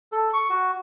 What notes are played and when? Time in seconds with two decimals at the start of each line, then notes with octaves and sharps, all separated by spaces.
0.12 A4
0.33 C#6
0.50 F#4